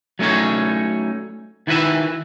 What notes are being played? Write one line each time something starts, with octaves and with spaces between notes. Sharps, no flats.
F#3 A3 C#4 D#4 C#5
D#3 E4 F#4 B4 E5